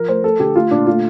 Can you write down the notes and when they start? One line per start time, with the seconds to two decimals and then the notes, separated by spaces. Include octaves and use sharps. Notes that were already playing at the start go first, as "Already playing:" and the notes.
Already playing: F3 A#4
0.08 A3 C5
0.24 A3 A4
0.40 D3 G4
0.55 A3 F4
0.71 A#2 D4
0.87 A3 F4